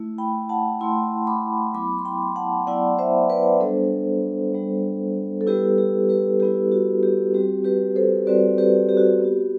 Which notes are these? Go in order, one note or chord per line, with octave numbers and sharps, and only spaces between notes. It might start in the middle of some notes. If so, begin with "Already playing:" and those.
Already playing: A3 E4
G5 B5
F#5 A5
A3 E4 A5 C6
B5 D6
F#3 B3 E4 B5 D6
C6
G5 B5
F#5 A5
F#3 B3 E4 D5 F#5
C5 E5
B4 D5
G3 B3 D4 A4 C5
G3 B3 D4
A4
G3 B3 E4 G4 B4
G4
G4 B4
G3 B3 E4 G4
F#4
G4
G3 C4 F#4 G4
G4 B4
A4 C5
G3 C4 F#4 B4 D5
G4 B4
G4
F#4
G4
B3 F#4